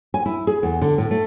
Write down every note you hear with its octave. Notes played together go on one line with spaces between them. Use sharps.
G#5
E4
G#4
E2
D3
A2
A3